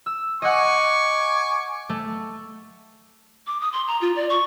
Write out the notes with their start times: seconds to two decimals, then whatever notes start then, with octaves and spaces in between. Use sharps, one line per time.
0.06 E6
0.42 D#5 F#5 G#5 C#6 D6
1.89 A3
3.47 D6
3.61 D#6
3.73 C6
3.87 A#5
4.01 F4
4.16 D5
4.30 C#6